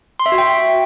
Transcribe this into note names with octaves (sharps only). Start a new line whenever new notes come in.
C6
E5
F#4
G5